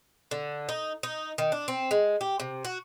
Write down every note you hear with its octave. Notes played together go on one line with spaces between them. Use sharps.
D3
D#4
D#4
D#3
D4
C4
G#3
G4
C3
F#4